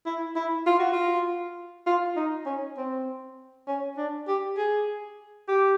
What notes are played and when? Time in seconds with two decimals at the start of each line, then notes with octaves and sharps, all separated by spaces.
0.06 E4
0.36 E4
0.66 F4
0.79 F#4
0.93 F4
1.86 F4
2.16 D#4
2.46 C#4
2.77 C4
3.68 C#4
3.97 D4
4.28 G4
4.57 G#4
5.48 G4